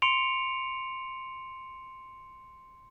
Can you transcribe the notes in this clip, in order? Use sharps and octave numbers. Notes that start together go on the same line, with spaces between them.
C6 C#7 D7 F7